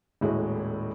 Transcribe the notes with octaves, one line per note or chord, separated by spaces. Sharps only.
D#1 A2 G#3 E4 F#4